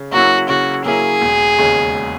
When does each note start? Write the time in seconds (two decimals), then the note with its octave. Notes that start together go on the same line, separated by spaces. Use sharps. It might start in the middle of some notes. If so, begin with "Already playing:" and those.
Already playing: C#3
0.12 F#3 A#3 C#4 E4 F#4
0.49 C#3 F#4
0.85 F#3 A#3 C#4 E4 G#4
1.22 E1
1.58 D#2 C#3 G#3